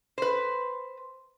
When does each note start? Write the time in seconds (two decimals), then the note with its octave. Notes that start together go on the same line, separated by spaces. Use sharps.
0.18 B4 C5